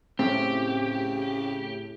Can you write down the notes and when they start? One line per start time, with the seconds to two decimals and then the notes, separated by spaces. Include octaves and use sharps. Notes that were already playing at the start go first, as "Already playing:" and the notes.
0.19 A2 C#3 C4 G4